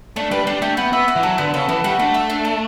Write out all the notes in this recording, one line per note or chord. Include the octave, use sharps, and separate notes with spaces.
A3 D4
G3 B4
G3 D4
A3 G4
B3 F#4
B3 E5
F#4
E3
F#3 A4
D3 B3
C#3 A4
E3 B3
G3 F#4
A3 D4
E5
D4
A4